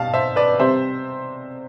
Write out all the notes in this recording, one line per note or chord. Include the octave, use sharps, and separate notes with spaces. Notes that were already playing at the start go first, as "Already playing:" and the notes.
Already playing: B2 G3 B3 F5 A5
C5 E5
B4 D5
C3 G3 C4 C5 E5